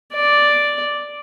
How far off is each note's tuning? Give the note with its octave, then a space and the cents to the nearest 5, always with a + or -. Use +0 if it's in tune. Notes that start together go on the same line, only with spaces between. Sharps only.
D5 +0